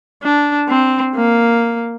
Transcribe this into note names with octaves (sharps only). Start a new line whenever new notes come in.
D4
C4
A#3